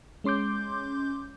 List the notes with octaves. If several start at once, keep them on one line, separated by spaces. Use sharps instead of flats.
G#3 C#4 C6 D6 G6